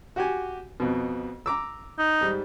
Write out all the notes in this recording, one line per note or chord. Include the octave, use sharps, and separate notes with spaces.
F#4 G4 G#5
F2 B2
A#5 D6 E6
D#4
G#2 G3